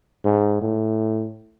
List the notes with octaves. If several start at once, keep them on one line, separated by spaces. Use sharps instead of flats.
G#2
A2